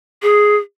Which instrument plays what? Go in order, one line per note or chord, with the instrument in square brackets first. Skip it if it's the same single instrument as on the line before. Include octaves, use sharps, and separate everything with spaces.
[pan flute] G#4